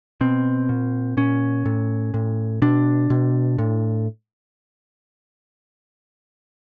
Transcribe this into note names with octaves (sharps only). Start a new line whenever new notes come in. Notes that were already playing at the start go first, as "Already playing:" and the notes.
B2 C4
A#2
A#2 C#4
A2
A2
B2 D4
B2
A2